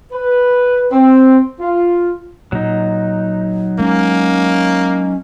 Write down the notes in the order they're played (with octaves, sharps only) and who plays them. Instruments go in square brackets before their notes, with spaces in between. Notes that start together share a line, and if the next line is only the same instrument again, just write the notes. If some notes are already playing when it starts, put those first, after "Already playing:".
[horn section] B4
C4
F4
[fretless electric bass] A#2 [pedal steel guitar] F#3 D#4
[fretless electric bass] G#3 [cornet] A#3 [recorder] C#4